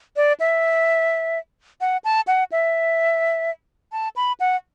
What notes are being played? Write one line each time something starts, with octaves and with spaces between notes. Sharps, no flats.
D5
E5
F#5
A5
F#5
E5
A5
B5
F#5